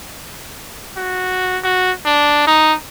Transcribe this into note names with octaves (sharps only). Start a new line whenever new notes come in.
F#4
F#4
D4
D#4